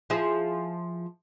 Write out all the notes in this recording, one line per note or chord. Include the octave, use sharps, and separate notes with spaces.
F3 E4 G#4